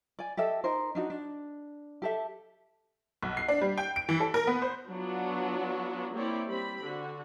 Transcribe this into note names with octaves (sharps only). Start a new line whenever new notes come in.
D5 G#5
G4 A4 D#5 E5
D#4 A#4 C5
D4 D#4 F#4
D4
G4 A4 E5
B1
C7
D4
G3
G5
D7
E3
A4
A#4
B3
C5
F#3 B3 D4 F4 F#4
A#3 C4 E4 C#5 D5
G3 C4 B5
D3 F#4